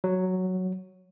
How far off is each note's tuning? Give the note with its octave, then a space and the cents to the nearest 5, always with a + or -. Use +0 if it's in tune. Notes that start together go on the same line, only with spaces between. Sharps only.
F#3 +0